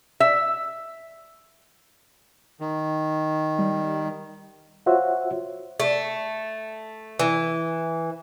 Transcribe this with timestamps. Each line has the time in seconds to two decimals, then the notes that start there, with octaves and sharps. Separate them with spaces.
0.20 E5
2.61 D#3
3.59 G3
4.86 F4 F#4 C5 C#5 E5 F#5
5.80 A3
7.20 E3